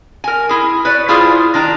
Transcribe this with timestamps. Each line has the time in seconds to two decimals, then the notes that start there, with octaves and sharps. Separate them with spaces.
0.24 A#4 G#5
0.49 E4 G#4
0.85 B4 C#5 D5
1.08 G3 E4 F4 G#4 C5
1.54 D#3 D4 A#5